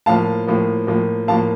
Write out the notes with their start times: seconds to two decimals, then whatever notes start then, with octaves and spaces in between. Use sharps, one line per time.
0.06 A2 F3 A#3 F5 A5
0.47 A2 F3 A#3
0.87 A2 F3 A#3
1.28 A2 F3 A#3 F5 A5